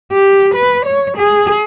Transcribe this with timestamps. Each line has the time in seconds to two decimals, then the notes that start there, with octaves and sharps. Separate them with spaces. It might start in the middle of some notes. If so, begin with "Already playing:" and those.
0.13 G4
0.55 B4
0.86 C#5
1.18 G#4